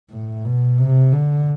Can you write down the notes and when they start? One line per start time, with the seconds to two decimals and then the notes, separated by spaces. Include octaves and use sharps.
0.12 A2
0.45 B2
0.79 C3
1.13 D3